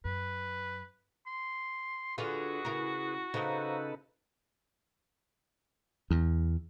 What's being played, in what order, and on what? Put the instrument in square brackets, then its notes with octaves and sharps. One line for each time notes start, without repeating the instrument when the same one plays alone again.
[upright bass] F#2 [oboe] B4
[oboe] C6
[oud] D3 F4 [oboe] F#4 [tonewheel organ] G#4 B4
[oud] C#3 A#4 [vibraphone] E4
[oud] C#3 [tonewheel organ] D#4 A4 B4 [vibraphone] C5 F5 A#5
[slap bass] E2